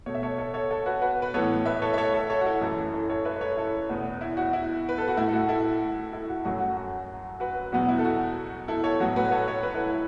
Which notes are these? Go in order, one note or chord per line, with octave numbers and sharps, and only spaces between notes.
B2 A3 C#5
E5
A4 C#5
A4 C#5
A4 C#5
A4 C#5
F#4 B4
F#4 B4
B4
A2 E3 B3 A4 C#5
B4 E5
A4 C#5
E5
A4 C#5
A4 C#5
A4 C#5
F#4
E4 A4
F#2 E3 A3 E4 A4
E4 A4
A4 C#5
B4 E5
A4 C#5
E4 A4
E2 B2 B3
E4
F#4
E4
B4
A4
F#4
A2 A3 E4
A4
F#4
E4 A4
E4 A4
F#4
F#2 F#3 A3 F#4
F#4
F#4
F#4 B4
E2 B2 F#3 B3 F#4
E4
A4
F#4
E4 A4
A4 C#5
A2 F#3 B3 F#4
F#4 B4
A4 C#5
A4 C#5
F#4 B4
E4 A4
E4